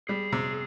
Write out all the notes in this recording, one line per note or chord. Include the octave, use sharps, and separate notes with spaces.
G3 G#4
C3